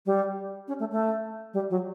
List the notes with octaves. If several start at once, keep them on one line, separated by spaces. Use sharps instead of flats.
G3
C#4
A3
A3
G3
F#3